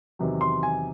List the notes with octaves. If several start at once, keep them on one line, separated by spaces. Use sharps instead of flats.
E2 C3 D#3 F#3
C6
G#5